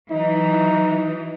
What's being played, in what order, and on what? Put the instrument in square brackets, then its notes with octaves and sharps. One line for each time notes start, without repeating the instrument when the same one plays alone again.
[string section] E3 F#3 [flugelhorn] D#4